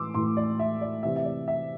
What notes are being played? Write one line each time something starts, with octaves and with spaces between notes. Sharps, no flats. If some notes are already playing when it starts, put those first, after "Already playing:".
Already playing: A2 E3 C6 D6 E6
A2 E3 C6
D5
E5
D5
C3 E3 E5
E5
D5
E5